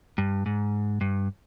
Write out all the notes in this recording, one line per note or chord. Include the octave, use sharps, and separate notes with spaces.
G2
G#2
G2